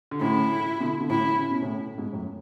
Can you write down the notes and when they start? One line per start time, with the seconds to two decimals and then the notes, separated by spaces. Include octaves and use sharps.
0.11 D3
0.20 A2 C#3 E4
0.80 B2 D3
1.00 B2 D3
1.10 A2 C#3 E4
1.39 C#3
1.51 B2
1.62 A2 C#3
1.98 G#2 B2
2.13 F#2 A2